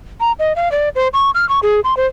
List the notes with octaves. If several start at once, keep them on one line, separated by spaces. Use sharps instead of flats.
A#5
D#5
F5
D5
C5
C#6
F6
C#6
G#4
C6
C5